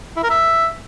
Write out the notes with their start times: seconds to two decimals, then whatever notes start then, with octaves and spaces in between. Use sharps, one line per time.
0.16 E4
0.23 A#4
0.30 E5